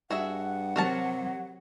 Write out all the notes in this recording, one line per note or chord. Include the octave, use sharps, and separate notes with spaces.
G2 F#4 G#4 E5 F#5
C3 F#3 F#4 A#4 A5